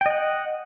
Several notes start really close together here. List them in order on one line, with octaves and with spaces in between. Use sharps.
G5 D#5 F#5